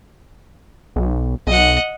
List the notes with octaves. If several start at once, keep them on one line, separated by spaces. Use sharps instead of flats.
B1
B1 D#5 F#5